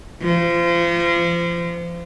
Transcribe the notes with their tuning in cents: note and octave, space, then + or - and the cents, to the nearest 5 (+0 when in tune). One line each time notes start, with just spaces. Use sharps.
F3 -30